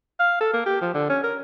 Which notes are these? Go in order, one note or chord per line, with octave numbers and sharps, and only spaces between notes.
F5
A4
A#3
G4
F3
D3
C#4
A#4